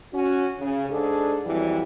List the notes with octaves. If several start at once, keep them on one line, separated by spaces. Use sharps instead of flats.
C#4 F#4
C#3
G#2 D4 G#4 A4
F2 E3 F#3 G3